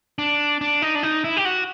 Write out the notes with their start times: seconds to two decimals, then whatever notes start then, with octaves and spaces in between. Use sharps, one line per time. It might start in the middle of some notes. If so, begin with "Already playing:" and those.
0.19 D4
0.61 D4
0.82 D#4
0.95 D4
1.03 D#4
1.24 E4
1.37 G4
1.45 F#4